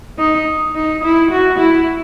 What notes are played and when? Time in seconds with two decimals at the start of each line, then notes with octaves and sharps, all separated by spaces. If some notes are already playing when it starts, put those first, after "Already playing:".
0.18 D#4
0.75 D#4
1.04 E4
1.31 F#4
1.59 E4